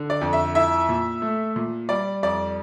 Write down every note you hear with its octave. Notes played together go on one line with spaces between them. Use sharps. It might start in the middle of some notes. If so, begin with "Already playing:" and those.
Already playing: D3
D5
F2
E5
E4 E5
A#2
A3
A#2
G3 D5
F2 D5